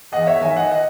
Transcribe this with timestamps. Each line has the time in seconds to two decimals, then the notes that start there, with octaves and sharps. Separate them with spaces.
0.12 E2 D#5 F#5
0.27 C#5 E5
0.41 D#3 E5 G#5
0.56 D#5 F#5
0.71 D#5 F#5